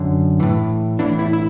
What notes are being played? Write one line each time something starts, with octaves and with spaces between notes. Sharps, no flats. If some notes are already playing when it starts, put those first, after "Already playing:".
Already playing: F#2 D3
A2 E3
A2 E3 D4
E4
E4